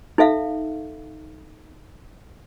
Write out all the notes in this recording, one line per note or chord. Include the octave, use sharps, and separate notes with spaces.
D#4 A4 E5 F5